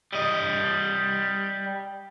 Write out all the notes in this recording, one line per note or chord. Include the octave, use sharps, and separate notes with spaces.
G3 D#5